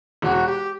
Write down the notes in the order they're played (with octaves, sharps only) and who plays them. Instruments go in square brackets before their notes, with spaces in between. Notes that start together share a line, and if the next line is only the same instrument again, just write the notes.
[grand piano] E1 [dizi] F#4
[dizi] G4